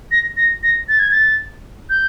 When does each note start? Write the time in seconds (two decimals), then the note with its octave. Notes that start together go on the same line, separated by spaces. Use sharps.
0.12 A#6
0.37 A#6
0.63 A#6
0.89 A6
0.99 G#6
1.11 A6
1.90 G6